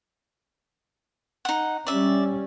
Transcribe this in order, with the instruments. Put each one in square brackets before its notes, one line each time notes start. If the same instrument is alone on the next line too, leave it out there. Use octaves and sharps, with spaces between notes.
[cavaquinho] D#4 F#5
[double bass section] G3 C#4 [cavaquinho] D5 E5